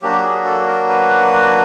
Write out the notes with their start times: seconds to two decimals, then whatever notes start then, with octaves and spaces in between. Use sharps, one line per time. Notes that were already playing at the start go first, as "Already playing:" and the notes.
0.02 F#3 A#3 D4 F#4 G4
0.23 G#4
0.45 A4
0.67 A#4
0.89 B4